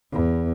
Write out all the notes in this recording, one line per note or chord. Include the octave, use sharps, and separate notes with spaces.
E2